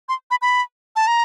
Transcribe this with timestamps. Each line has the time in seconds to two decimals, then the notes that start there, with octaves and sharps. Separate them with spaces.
0.09 C6
0.31 B5
0.42 B5
0.96 A5
1.07 A#5